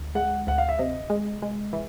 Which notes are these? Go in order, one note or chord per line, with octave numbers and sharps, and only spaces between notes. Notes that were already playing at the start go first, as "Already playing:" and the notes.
Already playing: D2
G#3 F#5
D2 F#5
F5
E5
C3 D#5
G#3
G#3
E3